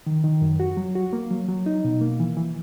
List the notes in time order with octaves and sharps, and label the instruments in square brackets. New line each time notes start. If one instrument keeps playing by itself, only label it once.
[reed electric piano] D#3
D#3
F#2
F#4
F#3
F#4
A#3
F#3
F#3
D#4
B2
A#3
E3
E3